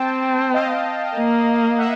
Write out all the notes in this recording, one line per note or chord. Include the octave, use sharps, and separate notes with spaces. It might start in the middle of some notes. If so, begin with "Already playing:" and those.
Already playing: C4 G5 A5
D#5 F5
A#3
E5 F#5